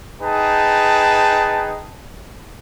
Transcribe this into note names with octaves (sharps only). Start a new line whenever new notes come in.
D#4 G#4 B4 G5 A5